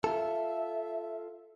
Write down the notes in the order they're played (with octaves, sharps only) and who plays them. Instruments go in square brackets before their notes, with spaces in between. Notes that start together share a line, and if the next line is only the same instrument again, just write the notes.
[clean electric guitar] F4 A4 [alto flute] E5